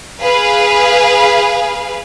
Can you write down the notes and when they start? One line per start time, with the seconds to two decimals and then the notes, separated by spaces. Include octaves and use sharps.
0.21 G#4 B4 F5